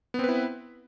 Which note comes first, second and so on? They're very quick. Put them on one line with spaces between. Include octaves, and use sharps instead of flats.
B3 C4 B4 E4